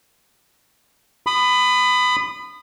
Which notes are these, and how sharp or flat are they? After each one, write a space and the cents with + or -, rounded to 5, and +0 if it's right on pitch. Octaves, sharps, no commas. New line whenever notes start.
B5 +20 D#6 -20